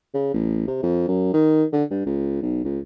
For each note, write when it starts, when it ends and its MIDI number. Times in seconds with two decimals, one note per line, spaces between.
0.14 0.32 49
0.34 0.66 33
0.67 0.80 48
0.83 1.04 41
1.08 1.32 42
1.33 1.64 51
1.73 1.84 50
1.91 2.06 43
2.06 2.38 37
2.42 2.62 35
2.65 2.79 37